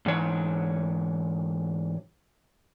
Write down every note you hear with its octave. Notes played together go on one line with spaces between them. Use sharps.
G#2 E3 C#5